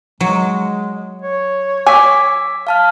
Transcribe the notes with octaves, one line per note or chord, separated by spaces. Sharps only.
F#3 G#3
C#5
G#5 D6 E6 B6
F5 A5 F6